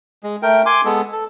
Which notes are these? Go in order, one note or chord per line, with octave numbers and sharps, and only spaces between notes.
G#3
A3 A#4 G5
G#5 C6 D6
G#3 B3 A4
A4